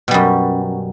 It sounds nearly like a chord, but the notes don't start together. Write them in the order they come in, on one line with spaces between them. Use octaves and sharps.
B2 G3 F#2